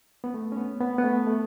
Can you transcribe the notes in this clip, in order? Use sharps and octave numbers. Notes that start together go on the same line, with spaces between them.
B3
A3
C#4
B3
B3
B3
A3
A3